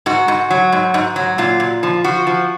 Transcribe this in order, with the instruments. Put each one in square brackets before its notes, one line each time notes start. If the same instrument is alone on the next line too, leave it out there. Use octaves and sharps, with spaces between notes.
[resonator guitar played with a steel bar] G#2 F#4
G#2
F#3
G#2
G#2
F#3
A#2 F4
A#2
F3
F3 F#4
F3